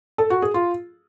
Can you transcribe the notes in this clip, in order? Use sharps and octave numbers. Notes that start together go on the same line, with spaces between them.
A4
F#4
G#4
F4